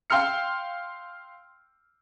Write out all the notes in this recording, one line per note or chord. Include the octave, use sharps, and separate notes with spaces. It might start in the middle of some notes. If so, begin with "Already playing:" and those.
F5 G5 C6 E6 F6 C#7